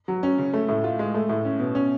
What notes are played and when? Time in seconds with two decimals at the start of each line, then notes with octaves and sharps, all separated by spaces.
0.08 F#3
0.23 C#4
0.38 C#3
0.54 A3
0.68 A2
0.84 F4
0.99 G#3
1.14 A3
1.29 A2
1.45 C#4
1.60 B2
1.75 C#4